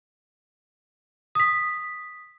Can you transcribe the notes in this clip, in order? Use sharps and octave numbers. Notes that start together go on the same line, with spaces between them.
D#6 B6